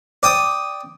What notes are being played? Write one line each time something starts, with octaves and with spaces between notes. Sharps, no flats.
D5 G5 D#6